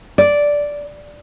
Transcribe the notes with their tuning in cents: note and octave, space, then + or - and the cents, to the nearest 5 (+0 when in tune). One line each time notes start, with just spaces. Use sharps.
D5 -5